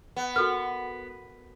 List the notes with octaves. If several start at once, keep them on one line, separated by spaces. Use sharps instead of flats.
B3
F#4 A4 A#4 F6